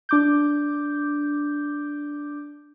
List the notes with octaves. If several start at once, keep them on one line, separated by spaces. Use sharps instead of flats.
D4 D6 G6